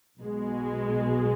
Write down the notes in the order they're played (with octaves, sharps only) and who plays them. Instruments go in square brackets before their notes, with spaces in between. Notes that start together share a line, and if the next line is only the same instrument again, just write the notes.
[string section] B1 B2 G#3